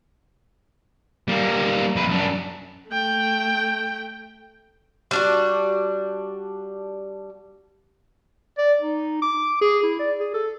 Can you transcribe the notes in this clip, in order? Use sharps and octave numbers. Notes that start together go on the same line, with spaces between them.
G3 A#3
F2 B4
F#2 D4
A3 G5
G3 D4 F#4
D5
D#4
D6
G#4
E4
D5
G#4
A4